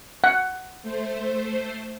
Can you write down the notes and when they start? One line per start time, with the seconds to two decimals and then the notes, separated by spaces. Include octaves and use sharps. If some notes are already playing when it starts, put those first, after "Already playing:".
0.24 F#5
0.82 A3 C5